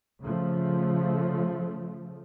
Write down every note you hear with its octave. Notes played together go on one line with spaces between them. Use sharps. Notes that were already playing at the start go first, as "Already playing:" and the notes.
C#3 F3 A3